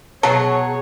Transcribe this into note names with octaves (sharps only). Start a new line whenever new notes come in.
B2 F#3 G#4 C#5 F#5 A5